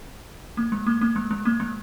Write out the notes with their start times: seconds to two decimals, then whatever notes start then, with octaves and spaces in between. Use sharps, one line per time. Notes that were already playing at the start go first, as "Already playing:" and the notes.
0.57 A#3
0.72 G#3
0.87 A#3
1.01 A#3
1.16 G#3
1.31 G#3
1.45 A#3
1.60 G#3